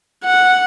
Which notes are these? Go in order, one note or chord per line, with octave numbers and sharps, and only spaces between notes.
F#5